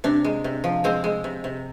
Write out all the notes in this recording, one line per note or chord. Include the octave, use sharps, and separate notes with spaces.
C3 D4
G#3
C3
F3
G#3 C4
G#3
C3
C3